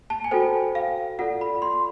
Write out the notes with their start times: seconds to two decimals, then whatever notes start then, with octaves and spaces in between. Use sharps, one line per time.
0.10 A5
0.24 G#5
0.31 F#4 A4 C5 G5
0.75 F5
1.19 F4 A4 D5 F#5
1.41 B5
1.62 C6